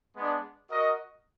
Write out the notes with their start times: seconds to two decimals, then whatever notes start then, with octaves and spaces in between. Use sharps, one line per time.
0.15 G#3 B3 D4
0.70 F#4 A#4 D#5